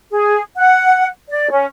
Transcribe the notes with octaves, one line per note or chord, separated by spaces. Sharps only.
G#4
F#5
D5
C#4